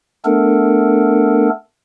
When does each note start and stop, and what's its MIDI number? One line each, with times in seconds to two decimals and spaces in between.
0.25 1.49 57
0.25 1.49 59
0.25 1.49 62
0.25 1.49 69
0.25 1.49 70